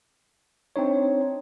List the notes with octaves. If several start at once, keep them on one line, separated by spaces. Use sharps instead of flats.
C4 D4 D#4 C#5